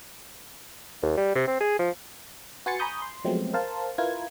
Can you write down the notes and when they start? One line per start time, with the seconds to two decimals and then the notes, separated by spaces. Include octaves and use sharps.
1.03 D#2
1.18 G3
1.35 C3
1.48 C4
1.60 G#4
1.79 F3
2.66 F#4 B4 G#5 C6 A6 C#7
2.79 G#5 A#5 B5 C#6 D#6 G6
3.02 C6
3.24 F3 F#3 G#3 A3 B3 C4
3.53 A#4 C5 F5 A5
3.98 E4 F4 A#4 B4 G#6